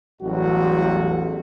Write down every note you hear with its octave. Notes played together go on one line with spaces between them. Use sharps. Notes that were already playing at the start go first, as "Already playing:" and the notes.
A1 E2 F#3 G3 F#4